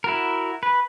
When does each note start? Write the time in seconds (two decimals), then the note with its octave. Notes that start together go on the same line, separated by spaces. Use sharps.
0.04 E4 F#4 A#4
0.63 B4